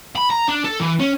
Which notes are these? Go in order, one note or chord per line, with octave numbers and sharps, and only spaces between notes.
B5
A#5
D4
A4
E3
C#4